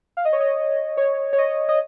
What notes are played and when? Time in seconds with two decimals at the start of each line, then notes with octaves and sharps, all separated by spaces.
0.17 F5
0.25 D#5
0.33 C#5
0.41 D#5
0.97 C#5
1.33 C#5
1.38 D#5
1.69 D#5